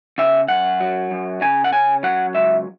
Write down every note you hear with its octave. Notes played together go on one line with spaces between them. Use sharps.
C#3 E5
F#2 F#5
F#3
F#2
C#3 G#5
F#5
C#4 G#5
F#3 F#5
C#2 E5